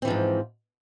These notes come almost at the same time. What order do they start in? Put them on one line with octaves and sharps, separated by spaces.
C4 E3 F3 G#2